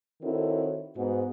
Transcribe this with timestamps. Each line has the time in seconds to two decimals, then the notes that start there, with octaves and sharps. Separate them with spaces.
0.23 D#3 C4 E4 F#4 A4 C#5
0.97 G#2 B3 F#4